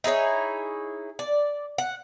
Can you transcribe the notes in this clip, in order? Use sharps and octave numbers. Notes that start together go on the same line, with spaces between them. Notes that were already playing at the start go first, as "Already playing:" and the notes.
D#4 E4 G#4 C#5
D5
F#5